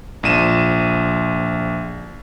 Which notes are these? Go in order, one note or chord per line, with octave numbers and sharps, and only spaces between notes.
A#1 F3 D#7 E7